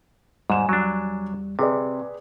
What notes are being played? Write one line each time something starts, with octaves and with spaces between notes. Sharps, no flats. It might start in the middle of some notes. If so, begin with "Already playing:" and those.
E2 G#2 G3 G#5 E7
F#3 D4
C3 C4 G#4 B4 D5